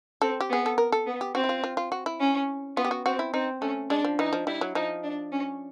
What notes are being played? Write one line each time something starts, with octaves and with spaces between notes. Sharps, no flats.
C4 A4
G4
B3 G#4
A4
A#4
A4
B3
G4
C4 F#4
E4
F4
F4
F4
F#4
E4
C#4
B3 F4
G4
F#4
C4 F#4
E4
C4 D#4
A3 C#4
G#3 D4
F3
E3 D#4
F3
G3 E4
F#3
F3 D#4
D4
C#4